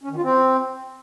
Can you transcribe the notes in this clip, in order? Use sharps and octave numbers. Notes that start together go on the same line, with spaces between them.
C#4
D#3
F4
C4